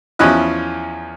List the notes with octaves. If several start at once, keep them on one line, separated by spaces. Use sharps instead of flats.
E2 F3 C#4 E4 D#5 F#6